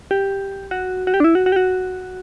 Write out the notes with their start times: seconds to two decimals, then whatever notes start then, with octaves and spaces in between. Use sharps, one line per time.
0.11 G4
0.71 F#4
1.07 F#4
1.14 G4
1.20 D4
1.24 E4
1.35 F#4
1.46 F#4
1.52 G4
1.56 F#4